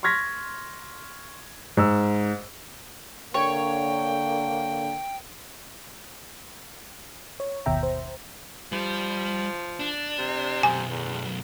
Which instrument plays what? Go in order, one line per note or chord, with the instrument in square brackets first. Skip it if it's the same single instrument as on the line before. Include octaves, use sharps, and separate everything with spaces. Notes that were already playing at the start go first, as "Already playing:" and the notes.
[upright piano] C6 C#6 F6 G#6 A#6 B6
G#2 E6
[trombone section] D3 A#3 [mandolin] C#5 [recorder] G5
[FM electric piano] C#5
G1 D#2 B2 E5 G5 A#5
C5
[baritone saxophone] F3 [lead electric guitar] G3
[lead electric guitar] D4
[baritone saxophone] C3
[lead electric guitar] B1 F#2 [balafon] G#5
[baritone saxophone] E2